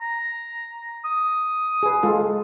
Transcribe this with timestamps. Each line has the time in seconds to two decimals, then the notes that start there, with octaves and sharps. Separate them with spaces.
0.01 A#5
1.05 D#6
1.83 G#4 B4
2.03 G#3 F4 A4